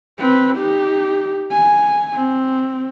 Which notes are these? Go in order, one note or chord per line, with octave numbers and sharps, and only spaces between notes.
C4 B4
D#4 G4
G#5
C4